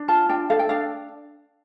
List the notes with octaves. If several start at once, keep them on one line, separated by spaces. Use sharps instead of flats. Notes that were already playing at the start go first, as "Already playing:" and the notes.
Already playing: D4
F4 A5
D4 G5
A4 F5
G5
D4 F5